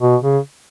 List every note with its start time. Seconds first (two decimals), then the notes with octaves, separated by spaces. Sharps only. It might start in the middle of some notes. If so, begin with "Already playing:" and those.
0.01 B2
0.23 C#3